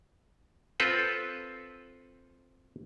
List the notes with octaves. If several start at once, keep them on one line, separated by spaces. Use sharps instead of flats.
C4 F4 A4 B4